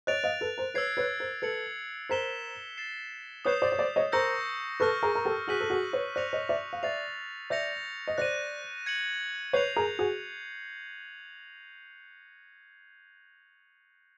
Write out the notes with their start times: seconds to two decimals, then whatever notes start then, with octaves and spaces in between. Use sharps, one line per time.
0.07 C#5 D#5 F#6 A6 D7 F7
0.24 D#5 F5
0.41 A4 B4
0.58 A#4 C5
0.74 B4 C#5 E6 G#6 C7
0.97 B4 C#5
1.20 A#4 C5
1.42 A4 B4 G#6 C#7 F#7
2.09 A#4 C5 G#6 B6 E7 G7
2.77 A6 C7 E7
3.45 B4 C#5 D#6 G6 C7 E7
3.62 C5 D5
3.72 C#5
3.78 C5 D5
3.96 C#5 D#5
4.12 A#4 C5 C#6 E6 G6 A#6 C#7
4.80 A4 B4 C#6 F6 A#6
5.03 G#4 A#4
5.15 A#4
5.25 G4 A4
5.47 F#4 G#4 F#6 B6 D#7 F#7
5.60 A4
5.70 F#4 G#4
5.93 B4 C#5
6.16 C5 D5 F#6 A#6 C#7 F7
6.33 C#5 D#5
6.49 D5 E5
6.73 F5
6.83 D5 E5 A6 C7 F7
7.50 D5 E5 G6 A#6 C#7 F7
8.08 D#5
8.18 C5 D5 F#6 A#6 D#7
8.86 G#6 C#7 F#7
9.53 B4 C#5 G6 C7 F7
9.76 G#4 A#4
9.99 F#4 G#4